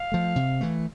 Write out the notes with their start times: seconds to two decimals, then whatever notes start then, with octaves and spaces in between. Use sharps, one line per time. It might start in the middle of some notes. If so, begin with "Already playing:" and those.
Already playing: F5
0.12 F3 A3
0.36 C3
0.61 E3 A3